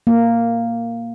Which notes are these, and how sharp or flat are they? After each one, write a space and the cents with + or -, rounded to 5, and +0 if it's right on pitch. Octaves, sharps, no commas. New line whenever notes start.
A#3 -5